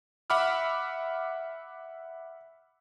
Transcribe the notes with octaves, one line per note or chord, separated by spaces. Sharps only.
E5 F#5 B5 D6 F6